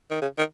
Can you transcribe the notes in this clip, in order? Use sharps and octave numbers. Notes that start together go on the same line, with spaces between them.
D#3
C#3
D#3